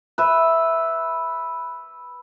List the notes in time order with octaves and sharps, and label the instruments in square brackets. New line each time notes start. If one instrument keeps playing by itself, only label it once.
[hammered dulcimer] B4 E5